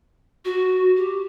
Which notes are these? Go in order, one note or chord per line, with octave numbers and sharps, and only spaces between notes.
F#4
G4